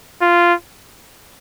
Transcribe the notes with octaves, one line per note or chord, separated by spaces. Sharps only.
F4